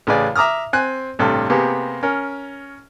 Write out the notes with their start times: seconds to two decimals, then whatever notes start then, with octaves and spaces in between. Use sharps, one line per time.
0.07 A1 C#3 G#4 B4 D5
0.35 E5 A#5 D6 D#6 F6
0.73 C4 G#5 F#6
1.19 A1 G2 C3 A4
1.50 C3 A#3 B3 G4 G#4
2.03 C#4 A#4